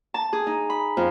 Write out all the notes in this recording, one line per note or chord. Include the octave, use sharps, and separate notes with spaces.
A5
G#4
D#4
B5
F2